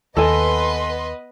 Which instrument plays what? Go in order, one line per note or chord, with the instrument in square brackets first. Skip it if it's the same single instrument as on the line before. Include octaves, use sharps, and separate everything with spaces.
[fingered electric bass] D#2 [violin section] B3 B4 D#5 [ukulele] A4 G#5 [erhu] C6